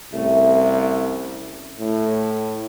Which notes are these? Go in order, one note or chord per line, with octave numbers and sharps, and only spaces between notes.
C2 A3 C#4
A2